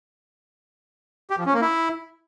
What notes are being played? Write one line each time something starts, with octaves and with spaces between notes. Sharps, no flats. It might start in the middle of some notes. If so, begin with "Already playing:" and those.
G4
F3
C#4
A#3
E4